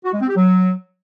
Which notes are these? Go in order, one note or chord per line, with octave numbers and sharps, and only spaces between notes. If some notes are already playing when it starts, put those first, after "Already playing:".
F#4
G#3
C4
G4
F#3